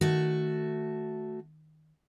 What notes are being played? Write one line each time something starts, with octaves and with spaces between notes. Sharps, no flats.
D#3 A3 F#4